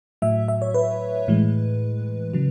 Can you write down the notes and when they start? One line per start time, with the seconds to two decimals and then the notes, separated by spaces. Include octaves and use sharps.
0.22 A2 F#3 E5
0.48 E5
0.62 C#5
0.74 B4
1.28 A2 E3 G#3
2.34 C#3 F#3